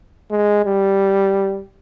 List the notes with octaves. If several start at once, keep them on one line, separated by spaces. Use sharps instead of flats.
G#3
G3